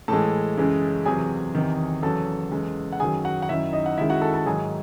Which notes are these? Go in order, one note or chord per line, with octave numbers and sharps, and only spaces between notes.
A2 E3 G#3 A4 A5
F#2 C#3 E3 G#3
E2 C3 F#3 G#4 G#5
E2 C3 D#3
E2 C#3 F#3 A4 A5
E2 C#3 G#3
F#5
F#2 D#3 F#3 G#4 G#5
F#4 F#5
F#5
F#2 D#3 F#3 E4 E5
D#4 D#5
F#5
F#2 D#3 G#3 E4 E5
F#4 F#5
A4 A5
A4 A5
G#2 D#3 F#3 G#4 G#5